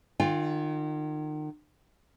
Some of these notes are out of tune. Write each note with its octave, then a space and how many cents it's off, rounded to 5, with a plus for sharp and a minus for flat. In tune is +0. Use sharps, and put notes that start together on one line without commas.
D#3 -35 F4 +0 G5 +40